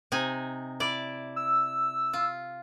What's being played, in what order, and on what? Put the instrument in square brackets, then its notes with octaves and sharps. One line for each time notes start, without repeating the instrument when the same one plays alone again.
[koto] C3 D#4 G#5
E4 D5
[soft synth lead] E6
[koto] F4